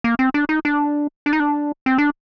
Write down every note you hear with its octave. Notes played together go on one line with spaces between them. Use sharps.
A#3
C4
D4
D#4
D4
D4
D#4
D4
C4
D4